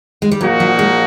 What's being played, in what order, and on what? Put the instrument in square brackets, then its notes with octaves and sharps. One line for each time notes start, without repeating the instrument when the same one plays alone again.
[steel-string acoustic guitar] G#3
G3
[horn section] A#2 F3 A#3 D#4 F#4 [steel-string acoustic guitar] F#3
[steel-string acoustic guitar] F#3
G#3